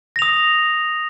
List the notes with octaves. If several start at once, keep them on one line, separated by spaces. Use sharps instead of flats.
D#6 A#6 F7